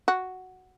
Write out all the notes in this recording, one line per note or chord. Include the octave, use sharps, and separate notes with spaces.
F#4